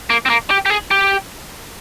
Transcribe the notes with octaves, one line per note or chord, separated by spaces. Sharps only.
A#3
C4
A#3
G4
G4
G#4
G4